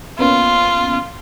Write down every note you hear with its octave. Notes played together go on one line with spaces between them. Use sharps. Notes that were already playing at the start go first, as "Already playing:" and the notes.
A#3 B3 C#4 F4